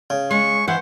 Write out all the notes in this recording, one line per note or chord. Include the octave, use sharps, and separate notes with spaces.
C#3
G#3 C#6
E3 C5 F#5